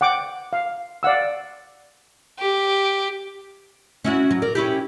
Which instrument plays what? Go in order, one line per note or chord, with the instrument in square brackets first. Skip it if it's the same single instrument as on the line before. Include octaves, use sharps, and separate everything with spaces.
[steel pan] F#5 G5 D6
F5
D5 F5 F#5 E6
[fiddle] G4
[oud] C#4 E4 F#4
F#3
A#4 D5
C#4 E4 G4